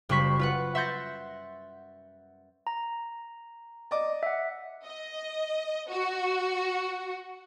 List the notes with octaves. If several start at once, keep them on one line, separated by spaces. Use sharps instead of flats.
F#1 G3 C5 B5 C#6 B6
F4 B4 F#5
E5 F#5 C6 G6 A6 A#6
A#5
D5 D#5 D6
E5 F#5
D#5
F#4